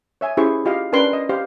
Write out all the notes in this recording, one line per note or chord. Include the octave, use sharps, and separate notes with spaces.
C#5 E5 G#5
C#4 E4 G4 G#4 C5 C#6
F4 G4 D#5 F5
C#4 D4 A#4 B4 G5 C6
D#5
G4 C5 F5